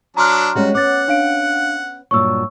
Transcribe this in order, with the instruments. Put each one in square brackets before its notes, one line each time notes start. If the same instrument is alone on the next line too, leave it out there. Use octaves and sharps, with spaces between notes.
[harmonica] F#3 D4 A5 [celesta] A#5 C6 F6
[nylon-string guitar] G3 G#3 C#4 [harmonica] F#4
[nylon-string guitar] B3 C#4 [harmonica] F#5 [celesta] D6 A6
[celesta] D4 F5 D7
[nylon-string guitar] G2 A#2 F#3 [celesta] C#6 E6